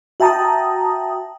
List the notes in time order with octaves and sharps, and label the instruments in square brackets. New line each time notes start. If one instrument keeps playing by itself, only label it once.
[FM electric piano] F#4 E5 G5 A5 A#5 D#6